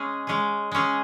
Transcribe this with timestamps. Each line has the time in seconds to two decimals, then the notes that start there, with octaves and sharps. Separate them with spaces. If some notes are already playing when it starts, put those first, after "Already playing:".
Already playing: G#3 C#4 G#4
0.27 G#3 C#4 G#4
0.72 G#3 C#4 G#4